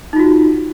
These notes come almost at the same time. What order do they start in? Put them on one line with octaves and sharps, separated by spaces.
D#4 F4 F#4